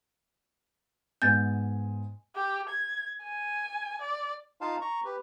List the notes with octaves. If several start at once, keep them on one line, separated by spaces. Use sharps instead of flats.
G#2 B3 G#5 G6 A6
G4
G#6
G#5
D5
D#4 F4 F5 A5
A#5 C#6
G4 B4